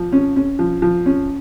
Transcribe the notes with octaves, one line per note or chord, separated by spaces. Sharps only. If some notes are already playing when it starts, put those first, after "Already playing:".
Already playing: F3
C#4
C#4
F3
F3
C#4